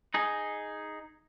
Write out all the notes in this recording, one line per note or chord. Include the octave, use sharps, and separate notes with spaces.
D#4 G#4